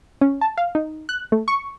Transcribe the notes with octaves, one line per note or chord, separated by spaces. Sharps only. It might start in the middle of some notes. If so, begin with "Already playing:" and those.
C#4
A5
F5
D#4
F#6
A3
C#6